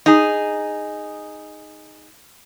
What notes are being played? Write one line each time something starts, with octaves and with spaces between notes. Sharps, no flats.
D#4 G#4